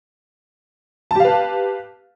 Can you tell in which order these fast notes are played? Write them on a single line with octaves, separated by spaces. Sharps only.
A5 G4 F5 B4